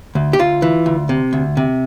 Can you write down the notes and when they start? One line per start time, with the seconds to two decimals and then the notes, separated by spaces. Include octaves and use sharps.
0.15 D2
0.33 G4
0.39 D2 F4
0.62 E3
0.86 D2
1.09 C3
1.33 D2
1.57 C3